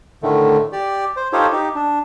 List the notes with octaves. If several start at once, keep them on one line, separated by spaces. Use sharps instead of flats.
A2 D3 D#3 A3
G4 D5
C5
D#4 F4 G4 A4 C5 C#5
D#4 G4
D4